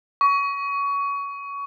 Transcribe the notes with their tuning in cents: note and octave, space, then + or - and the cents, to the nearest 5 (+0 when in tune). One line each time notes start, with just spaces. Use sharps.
C#6 +25